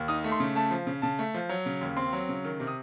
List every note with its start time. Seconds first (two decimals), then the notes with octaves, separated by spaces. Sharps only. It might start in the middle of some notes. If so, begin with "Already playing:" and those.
Already playing: D#2
0.08 D#4 D#6
0.24 A3
0.32 C6
0.40 C#3
0.55 A3 A5
0.71 F3
0.87 C#3
1.02 C#3 A5
1.19 A3
1.34 F3
1.49 F#3
1.66 C#3
1.81 D#2
1.97 C4 C6
2.13 F#3
2.29 C#3
2.45 D#3
2.60 C3
2.67 D#6